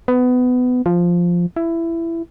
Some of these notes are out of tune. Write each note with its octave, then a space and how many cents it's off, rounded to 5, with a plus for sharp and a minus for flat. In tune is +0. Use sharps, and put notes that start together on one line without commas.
B3 +20
F3 +0
E4 +15